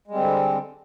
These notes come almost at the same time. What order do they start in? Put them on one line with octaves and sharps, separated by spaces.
G#3 G3 C4 D3